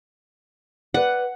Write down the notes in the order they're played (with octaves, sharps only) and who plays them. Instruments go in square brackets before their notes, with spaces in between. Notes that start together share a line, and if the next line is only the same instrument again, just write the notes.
[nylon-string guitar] B4 D5 [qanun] F#5